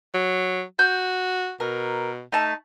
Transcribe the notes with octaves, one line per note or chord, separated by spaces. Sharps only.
F#3
F#4 G6
B2 A#4
A3 D#4 A5